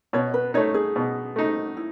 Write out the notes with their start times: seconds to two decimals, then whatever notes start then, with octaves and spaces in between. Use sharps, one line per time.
0.13 B2 C#5
0.34 B4
0.54 A3 D#4 C#5
0.74 G#4
0.96 B2
1.36 A3 D#4
1.77 E4